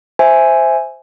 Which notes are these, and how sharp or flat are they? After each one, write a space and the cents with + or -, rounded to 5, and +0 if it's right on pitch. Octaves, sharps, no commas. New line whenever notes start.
C5 +0 E5 +0 G#5 +0